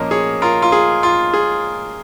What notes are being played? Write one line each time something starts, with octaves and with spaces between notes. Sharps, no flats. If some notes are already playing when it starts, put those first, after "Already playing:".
Already playing: A#2 F3 A#3 C#4 A#4 D#5
G#4 C#5
F4 A#4
F4
G#4
F4
G#4